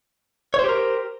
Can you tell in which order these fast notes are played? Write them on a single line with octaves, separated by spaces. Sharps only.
C#5 C5 G4 A#4